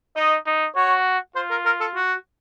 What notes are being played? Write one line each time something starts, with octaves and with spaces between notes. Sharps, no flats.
D#4 D#5
D#4
F#4 C#5
F4 C5
A#4
A#4
A4
F#4